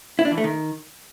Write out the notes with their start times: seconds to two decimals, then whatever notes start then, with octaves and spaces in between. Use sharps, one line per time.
0.19 E4
0.25 D4
0.31 E3
0.38 A3
0.44 D#3